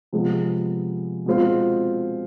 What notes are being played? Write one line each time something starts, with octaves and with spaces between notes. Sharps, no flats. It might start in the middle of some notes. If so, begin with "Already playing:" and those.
C3 F3 G#3 B3
B2 G#3 C4 F4